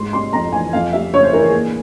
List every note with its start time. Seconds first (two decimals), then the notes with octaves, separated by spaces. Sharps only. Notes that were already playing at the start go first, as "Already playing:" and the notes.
Already playing: G#2 G#3 C6
0.13 C3 C6
0.33 F2 A#5
0.52 E3 G#5
0.73 F2 F5
0.93 G3 E5
1.12 C#3 C#5
1.23 C5
1.33 E3 A#4
1.43 G#4
1.54 A#2